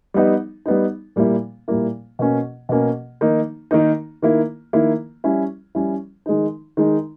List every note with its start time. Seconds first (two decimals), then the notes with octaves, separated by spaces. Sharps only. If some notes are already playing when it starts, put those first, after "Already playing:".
0.14 G3 B3 D#4
0.66 G3 B3 D#4
1.16 A#2 G3 A#3 E4
1.68 A#2 G3 A#3 E4
2.19 B2 A#3 C#4
2.69 B2 A#3 C#4
3.21 D#3 A#3 D#4
3.71 D#3 A#3 D#4
4.22 D#3 A#3 E4
4.73 D#3 A#3 E4
5.24 G3 C#4 E4
5.75 G3 C#4 E4
6.26 D#3 G#3 D#4
6.77 D#3 G#3 D#4